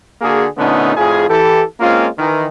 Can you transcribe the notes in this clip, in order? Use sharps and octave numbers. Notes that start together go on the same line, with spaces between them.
D3 A#3 F#4 G#4
A#2 D3 A3 B3 C#4 D#4
F2 A2 F4 G#4
E3 G4 A4
G#3 A#3 C4 C#4 F4
D#3 E3